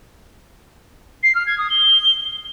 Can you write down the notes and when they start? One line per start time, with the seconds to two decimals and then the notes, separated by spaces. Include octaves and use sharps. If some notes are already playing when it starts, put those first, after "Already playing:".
1.23 C7
1.35 F6
1.46 G#6
1.58 D#6
1.70 G7